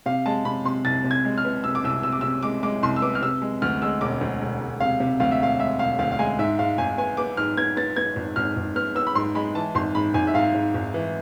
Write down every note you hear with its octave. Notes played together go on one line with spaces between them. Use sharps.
C3 F5
G#3 A5
C3 B5
C3 C6
C2 A6
C3
G#6
G#3
F6
B3
C3 E6
D6
C2 E6
C3 E6
D6
C3 E6
G#3 D6
G#3 D6
C2 C6
E6
B3 D6
F6
C3 E6
G#3
D2 F6
G#3 E6
E1 D6
D2
E1
E1
C3 F5
C3
D2 F5
E5
E1 F5
G#3 E5
E1 F5
D2 F5
F5
G#3 G#5
G#2 E5
G#2 F5
G#1 G#5
B3 G#5
B3 D6
G#2 F6
B3 G#6
B3 A6
B3 G#6
G#1
G#1 F6
G#1
B3 F6
B3 E6
B5
G#2 C6
G#3 B5
E3 A5
G#1 C6
G#2 B5
G#1 G#5
E5
G#2 F5
G#2
G#1
E3